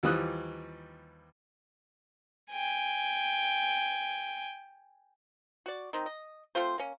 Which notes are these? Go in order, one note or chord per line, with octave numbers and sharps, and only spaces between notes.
D#2 E3 F3 G3 D#6 F#6
G5 G#5
F#4 D5
D#3 C4 D#4
D#5
A3 C4 F4 C5
A#3 C#4